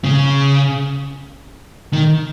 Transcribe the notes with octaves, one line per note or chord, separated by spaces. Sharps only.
C#3
D#3